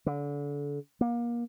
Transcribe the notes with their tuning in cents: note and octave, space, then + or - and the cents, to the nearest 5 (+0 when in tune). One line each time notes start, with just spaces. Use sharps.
D3 -30
A#3 +30